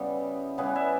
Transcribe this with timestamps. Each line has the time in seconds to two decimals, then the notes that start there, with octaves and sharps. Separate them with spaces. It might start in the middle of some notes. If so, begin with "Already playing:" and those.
Already playing: C#3 G3 B3 E4
0.58 C#3 G3 B3 G#4 B4
0.75 E5 G#5